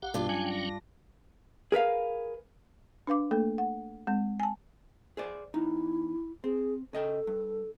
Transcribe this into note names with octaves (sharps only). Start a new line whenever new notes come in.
A#1 G4 F5 F#5
G2 B2 D4 F4
F#3 C#4 G5 G#5
A#6
G#4 A#4 B4 F5
D4 B4 F5 D6
A3 A#3 A4
F#5
G#3 C4
G#5 A5
G#4 C5 D5
E2 D#4 E4
C4 G#4
C#3 A4 D#5 G5
G2